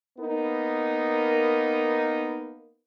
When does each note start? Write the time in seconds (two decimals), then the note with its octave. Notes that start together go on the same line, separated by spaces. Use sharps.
0.19 A#3 B3 D#4 A#4